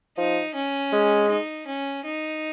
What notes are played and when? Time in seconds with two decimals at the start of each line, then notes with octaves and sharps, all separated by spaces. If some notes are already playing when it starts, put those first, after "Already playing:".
0.17 F3 D#4
0.55 C#4
0.92 G#3
1.30 D#4
1.67 C#4
2.05 D#4